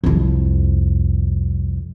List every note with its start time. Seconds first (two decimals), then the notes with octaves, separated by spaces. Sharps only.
0.04 C2 F2